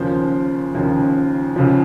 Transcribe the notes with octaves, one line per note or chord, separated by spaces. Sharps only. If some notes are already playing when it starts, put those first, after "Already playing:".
Already playing: D#2 C#3 F3 C5
D#2 C#3 F3
C#2 C#3 F3